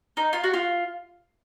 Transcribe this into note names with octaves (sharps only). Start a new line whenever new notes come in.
D#4
F4
F#4
F4